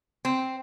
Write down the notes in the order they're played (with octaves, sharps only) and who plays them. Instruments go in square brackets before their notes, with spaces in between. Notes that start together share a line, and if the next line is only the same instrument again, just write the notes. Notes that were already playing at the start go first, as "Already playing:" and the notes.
[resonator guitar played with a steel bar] C4